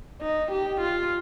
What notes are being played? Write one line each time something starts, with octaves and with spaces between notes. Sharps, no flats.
D#4
G4
F4